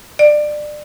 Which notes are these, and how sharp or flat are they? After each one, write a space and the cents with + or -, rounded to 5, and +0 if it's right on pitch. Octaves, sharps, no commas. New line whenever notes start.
D5 +25